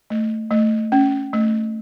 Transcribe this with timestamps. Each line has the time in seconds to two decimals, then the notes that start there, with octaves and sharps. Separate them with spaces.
0.10 A3
0.51 A3
0.92 C#4
1.33 A3